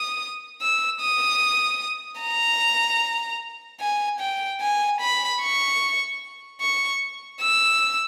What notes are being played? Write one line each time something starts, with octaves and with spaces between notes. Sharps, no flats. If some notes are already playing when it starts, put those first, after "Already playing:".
Already playing: D#6
E6
D#6
A#5
G#5
G5
G#5
B5
C#6
C#6
E6